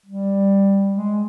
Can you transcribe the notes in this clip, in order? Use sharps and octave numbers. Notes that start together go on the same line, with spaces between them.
G3
G#3